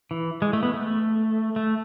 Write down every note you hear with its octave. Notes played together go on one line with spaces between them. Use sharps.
E3
G#3
A3
B3
A3
A3